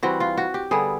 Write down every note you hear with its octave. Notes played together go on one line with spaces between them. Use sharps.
E3 G3 C4 F#4
F4
F#4
G4
D3 G3 B3 E4 G#4